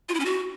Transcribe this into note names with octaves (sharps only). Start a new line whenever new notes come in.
F4
E4
C#4
F#4